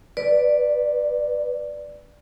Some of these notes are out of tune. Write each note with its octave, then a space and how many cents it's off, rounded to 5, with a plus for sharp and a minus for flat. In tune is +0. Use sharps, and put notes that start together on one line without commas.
B4 +0 D5 +0